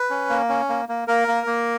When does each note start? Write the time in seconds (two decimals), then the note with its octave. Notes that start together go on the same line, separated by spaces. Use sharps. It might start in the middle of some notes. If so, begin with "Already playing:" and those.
Already playing: B4
0.10 C#4
0.30 A#3
0.49 C#4
0.69 A#3
0.89 A#3
1.08 A#3 A#4
1.28 A#3
1.47 A#3